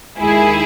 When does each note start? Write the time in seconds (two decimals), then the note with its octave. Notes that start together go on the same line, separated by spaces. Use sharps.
0.19 D#2 D#3 G#3 E4 G#4